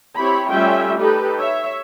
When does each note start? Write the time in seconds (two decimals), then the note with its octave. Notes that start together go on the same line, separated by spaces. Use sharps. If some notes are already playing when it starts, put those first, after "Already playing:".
0.16 C4 E4 G4 C#5 B5
0.49 G3 A3 C#4 F4 E5 G5
0.98 D#4 G4 A4 B4
1.39 C#5 E5